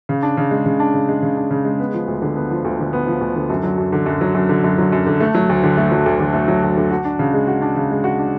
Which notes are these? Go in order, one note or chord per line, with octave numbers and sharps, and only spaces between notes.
C#3
D4
C#3
G#3
C#3
D4
C#3
G#3
C#3
D4
C#3
G#3
B3
F3
D2
D3
B3
F3
D2
D3
B3
F3
D2
D3
F#2
F#3
F#2
D3
F#2
F#3
F#2
D3
F#2
F#3
F#2
D3
A3
F#3
D2
D3
A3
F#3
D2
D3
A3
F#3
D2
D3
F#4
D4
C#3
G#3
F#4
D4
C#3
G#3
F#4
D4